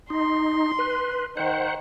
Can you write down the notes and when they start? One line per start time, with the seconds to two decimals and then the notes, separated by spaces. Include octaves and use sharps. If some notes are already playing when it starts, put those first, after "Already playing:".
0.10 D#4 C6
0.79 B4
1.37 D#3 C5 F#5